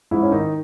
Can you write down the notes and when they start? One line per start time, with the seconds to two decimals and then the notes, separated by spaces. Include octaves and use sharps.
0.11 G#2 E4
0.23 C#4
0.32 D#3 D#4